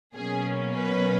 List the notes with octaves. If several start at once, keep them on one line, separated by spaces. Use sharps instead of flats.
B2 F#3 A#3 C#4 G#4
B4